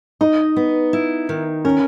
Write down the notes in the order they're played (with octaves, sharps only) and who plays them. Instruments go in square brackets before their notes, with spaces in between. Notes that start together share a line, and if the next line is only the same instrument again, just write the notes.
[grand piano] D#4 [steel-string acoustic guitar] D#5
[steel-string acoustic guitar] B3
E4
D#3
[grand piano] C#4 [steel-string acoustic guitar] A#4